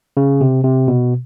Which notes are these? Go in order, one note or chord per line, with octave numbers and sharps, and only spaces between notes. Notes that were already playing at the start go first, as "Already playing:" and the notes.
C#3
C3
C3
B2